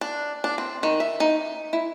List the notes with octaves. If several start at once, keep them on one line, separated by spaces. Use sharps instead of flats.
D4
D4
C4
D#3
E5
D#4
E4